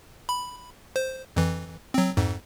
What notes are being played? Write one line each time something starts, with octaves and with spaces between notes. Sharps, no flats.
B5
C5
F2 E3
F#3 C4
F2 G#2